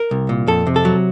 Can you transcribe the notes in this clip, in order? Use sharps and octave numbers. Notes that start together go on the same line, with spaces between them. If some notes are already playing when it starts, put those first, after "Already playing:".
Already playing: A#4
C2
A#2
F2 A4
C3
A4
F#3